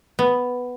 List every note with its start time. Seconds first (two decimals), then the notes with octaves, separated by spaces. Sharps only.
0.19 B3